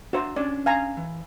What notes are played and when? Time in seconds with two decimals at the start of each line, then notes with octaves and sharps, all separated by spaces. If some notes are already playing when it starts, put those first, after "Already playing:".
0.13 D4 F#4 C5 E5 A#5
0.36 C#4 D4 D5
0.66 F5 G#5 A#5
0.97 E3